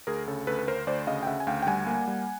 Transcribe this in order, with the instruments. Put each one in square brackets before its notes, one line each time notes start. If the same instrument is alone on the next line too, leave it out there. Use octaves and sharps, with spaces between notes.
[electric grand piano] D2 G#4 A#4
C#3 A4
D2 A4 B4
B4
D2 A#4 C5
D2 C5 D5
C#3 D#5 F5
G5
C#3 E5 F#5
G#5
D2 F5 G5
G5
G3 F#5 G#5
A#3
G3